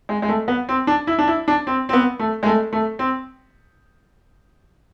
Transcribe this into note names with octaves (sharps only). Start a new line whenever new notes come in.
G#3
G#3
A3
B3
C4
D4
E4
D4
E4
D4
C4
C4
B3
A3
G#3
A3
A3
C4